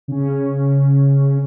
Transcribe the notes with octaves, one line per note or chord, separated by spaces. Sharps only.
C#3 C#4